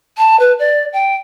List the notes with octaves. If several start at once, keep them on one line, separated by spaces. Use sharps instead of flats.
A5
B4
D5
G5